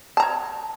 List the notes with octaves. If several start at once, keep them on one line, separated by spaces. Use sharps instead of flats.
C#5 A5 A#5